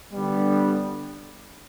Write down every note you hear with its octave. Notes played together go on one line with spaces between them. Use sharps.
D3 G3 B3